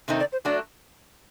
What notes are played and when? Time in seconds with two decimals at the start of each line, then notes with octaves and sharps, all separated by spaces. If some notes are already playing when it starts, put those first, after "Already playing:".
0.08 C3 D#3 A3 C4 D#4
0.20 D5
0.32 C5
0.45 F#3 A3 D4 F#4 D5